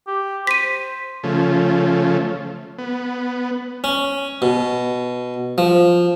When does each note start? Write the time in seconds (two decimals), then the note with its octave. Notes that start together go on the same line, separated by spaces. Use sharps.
0.07 G4
0.47 C5 B6 D#7
1.24 C#3 F3 A3
2.78 B3
3.84 C#4
4.42 B2
5.58 F3